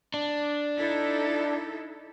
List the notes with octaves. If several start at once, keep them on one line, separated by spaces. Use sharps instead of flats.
D4
D#4 E4 A4